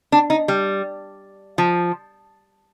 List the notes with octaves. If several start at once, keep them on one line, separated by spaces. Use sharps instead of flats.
D4
D#4
G3
F3